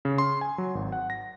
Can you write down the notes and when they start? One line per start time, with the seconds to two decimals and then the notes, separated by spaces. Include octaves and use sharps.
0.05 C#3
0.18 C6
0.41 G#5
0.58 F#3
0.75 G#1
0.92 F#5
1.10 A#6